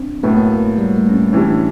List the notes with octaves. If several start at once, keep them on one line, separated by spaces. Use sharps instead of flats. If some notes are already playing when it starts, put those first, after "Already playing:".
Already playing: C4 D4
A2 F#3 A3 B3
A#3
A#3
G3
A3
C#4
C4
A2 E3 G3 C#4
D4